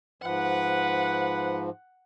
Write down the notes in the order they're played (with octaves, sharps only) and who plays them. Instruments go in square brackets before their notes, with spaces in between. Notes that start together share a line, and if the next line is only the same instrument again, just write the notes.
[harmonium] G#2 F3 [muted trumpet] B4 [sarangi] F#5